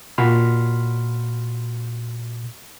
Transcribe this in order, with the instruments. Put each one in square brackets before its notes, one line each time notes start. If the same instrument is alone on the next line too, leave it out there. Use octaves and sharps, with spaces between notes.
[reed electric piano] A#2 F#4 B5 C6 F6